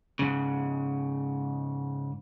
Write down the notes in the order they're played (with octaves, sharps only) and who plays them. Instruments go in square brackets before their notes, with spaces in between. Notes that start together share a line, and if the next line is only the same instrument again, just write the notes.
[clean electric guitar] G#2 C#3